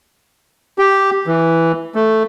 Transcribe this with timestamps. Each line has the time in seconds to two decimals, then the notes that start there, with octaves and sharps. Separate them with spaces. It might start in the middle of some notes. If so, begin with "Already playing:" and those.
0.78 G4
1.27 E3
1.95 A3